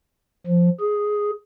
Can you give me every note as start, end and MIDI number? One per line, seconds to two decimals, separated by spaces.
0.47 0.69 53
0.80 1.31 68